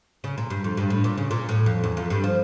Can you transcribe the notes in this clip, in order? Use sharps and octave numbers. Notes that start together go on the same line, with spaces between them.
C#3
A#2
G2
F2
G2
A2
A#2
C#3
A#2
A2
F2
E2
F2
G2
F3